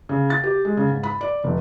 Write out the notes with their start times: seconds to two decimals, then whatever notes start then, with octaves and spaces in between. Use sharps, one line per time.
0.09 C#3
0.30 A6
0.44 G4
0.65 G#3
0.77 C#3
0.90 G#2
1.03 B5
1.21 D5
1.44 F1